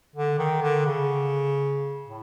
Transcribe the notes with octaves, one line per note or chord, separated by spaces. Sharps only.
D3
D#3
D3
C#3
A2